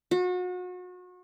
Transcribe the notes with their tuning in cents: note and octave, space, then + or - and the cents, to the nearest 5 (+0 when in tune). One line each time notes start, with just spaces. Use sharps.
F#4 -35